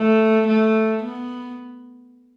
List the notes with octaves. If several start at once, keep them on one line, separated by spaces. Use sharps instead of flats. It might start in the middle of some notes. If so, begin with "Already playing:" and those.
Already playing: A3
A3
B3